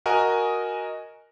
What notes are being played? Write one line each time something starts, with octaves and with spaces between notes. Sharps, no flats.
F#4 A#4 D#5 G#5